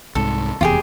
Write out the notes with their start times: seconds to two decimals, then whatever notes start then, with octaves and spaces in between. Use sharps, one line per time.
0.15 C2 G#2 A4
0.61 F1 E2 F4 G4 G#4